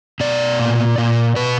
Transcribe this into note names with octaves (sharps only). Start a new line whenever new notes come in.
B2 D5
A#2
A#2
B2 B4